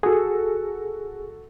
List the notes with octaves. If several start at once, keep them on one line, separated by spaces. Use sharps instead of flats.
F#4 G#4 A4